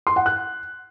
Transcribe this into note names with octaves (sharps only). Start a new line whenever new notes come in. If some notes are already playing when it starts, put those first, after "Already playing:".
C6
F#5
F#6